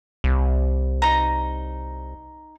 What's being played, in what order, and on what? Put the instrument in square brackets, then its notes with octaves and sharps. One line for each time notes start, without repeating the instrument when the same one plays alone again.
[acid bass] C2
[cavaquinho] D#4 A#5